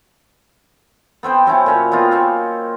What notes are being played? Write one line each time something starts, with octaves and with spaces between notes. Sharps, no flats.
B3 C4 C5 G5
F#3 C4 C#4 E4
A#2 C#4 C#5
B3 C4 D#4 F4
A#3 C4 C#4